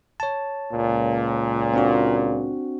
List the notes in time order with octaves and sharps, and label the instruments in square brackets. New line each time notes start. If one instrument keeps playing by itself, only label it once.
[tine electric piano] C#5 A5
[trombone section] C#2 A#2
[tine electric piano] C4 D4 F#4